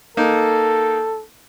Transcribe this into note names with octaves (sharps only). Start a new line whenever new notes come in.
A#3 D#4 A4